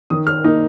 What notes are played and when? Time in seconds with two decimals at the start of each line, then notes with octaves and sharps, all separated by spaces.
0.10 D#3 D#6
0.27 F6
0.44 A#3 D#4